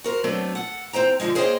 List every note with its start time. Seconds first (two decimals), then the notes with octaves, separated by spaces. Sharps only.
0.04 F#4 A#4 C5
0.24 F#3 A3 B3 C4 D4
0.55 A4 F#5
0.93 E3 C4 C5 G5 A#5
1.20 F#2 D3 D#3 F3 G#3
1.35 A#3 G#4 C5 C#5 D#5 G5